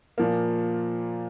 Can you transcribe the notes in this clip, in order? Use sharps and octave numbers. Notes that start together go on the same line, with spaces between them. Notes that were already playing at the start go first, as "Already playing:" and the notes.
A#2 F3 A#3